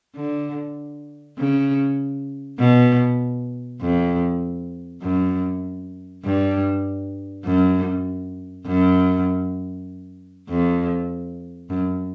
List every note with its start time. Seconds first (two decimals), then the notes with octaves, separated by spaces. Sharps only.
0.16 D3
1.38 C#3
2.59 B2
3.81 F2
5.02 F#2
6.24 G2
7.45 F#2
8.67 F#2
10.49 F2
11.70 F#2